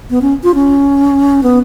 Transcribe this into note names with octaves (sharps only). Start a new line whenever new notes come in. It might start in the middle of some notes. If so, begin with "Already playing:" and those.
B3
C#4
F4
C#4
B3